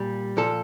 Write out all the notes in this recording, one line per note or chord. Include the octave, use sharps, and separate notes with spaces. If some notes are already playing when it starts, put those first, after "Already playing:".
Already playing: A#2 G3
A#2 F3 A4